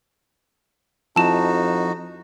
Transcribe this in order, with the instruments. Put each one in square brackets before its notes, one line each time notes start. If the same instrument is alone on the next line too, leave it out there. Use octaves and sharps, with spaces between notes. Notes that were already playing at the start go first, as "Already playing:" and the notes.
[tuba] F2 [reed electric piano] F3 E4 [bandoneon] D#4 F#4 [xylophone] A5 E7